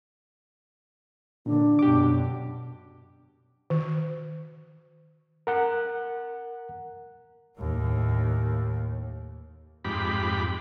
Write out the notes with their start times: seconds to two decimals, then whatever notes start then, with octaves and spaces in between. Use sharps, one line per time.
1.46 A#2 D3 D4
1.79 F#2 B2 G4 D6
3.70 D#3
5.47 A#4 F#5 F#6
7.59 D#2 A2
9.85 F2 G#2 G4 B5